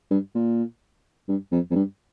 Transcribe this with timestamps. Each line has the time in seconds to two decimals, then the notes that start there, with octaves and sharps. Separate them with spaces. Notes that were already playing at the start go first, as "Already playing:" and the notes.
0.11 G2
0.35 A#2
1.29 G2
1.52 F2
1.71 F2
1.75 G2